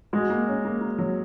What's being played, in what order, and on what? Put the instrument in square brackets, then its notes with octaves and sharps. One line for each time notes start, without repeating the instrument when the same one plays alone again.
[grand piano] G#3 [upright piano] F#4
[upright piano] A#3
C#4
A#3
A#3
F#3